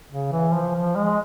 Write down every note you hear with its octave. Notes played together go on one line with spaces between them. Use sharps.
C#3
E3
F3
F3
G#3